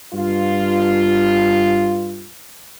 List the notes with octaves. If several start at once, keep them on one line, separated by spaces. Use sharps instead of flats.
G2 F4